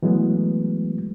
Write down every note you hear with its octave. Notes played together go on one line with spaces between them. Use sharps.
E3 F#3 G#3 A3 B3